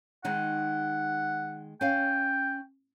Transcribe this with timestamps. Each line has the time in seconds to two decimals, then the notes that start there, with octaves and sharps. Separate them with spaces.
0.24 D#3 G#3 D#4 F#5
1.81 C#4 F5 G5